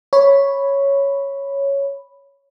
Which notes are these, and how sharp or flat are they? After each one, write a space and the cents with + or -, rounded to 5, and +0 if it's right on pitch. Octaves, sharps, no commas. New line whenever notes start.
C#5 +0 B5 +0